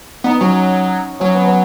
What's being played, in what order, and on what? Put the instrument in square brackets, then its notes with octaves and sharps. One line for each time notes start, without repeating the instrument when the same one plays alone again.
[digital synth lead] B3 [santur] D#4
[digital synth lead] F#3 [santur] C#4 F#4
[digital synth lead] F#3 [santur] C#4 F#4
[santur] B3
C#4